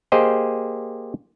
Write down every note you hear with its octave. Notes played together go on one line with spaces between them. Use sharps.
A#3 G4 G#4 C5 D#5